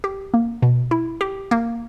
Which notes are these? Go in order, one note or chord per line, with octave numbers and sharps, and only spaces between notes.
G4
A#3
B2
E4
G4
A#3